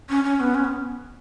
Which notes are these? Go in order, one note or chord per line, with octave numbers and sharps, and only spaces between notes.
C#4
C#4
B3
C#4
B3